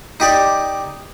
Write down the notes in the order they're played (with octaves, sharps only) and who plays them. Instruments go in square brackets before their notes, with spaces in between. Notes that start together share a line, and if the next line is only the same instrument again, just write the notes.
[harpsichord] D#4 G4 D5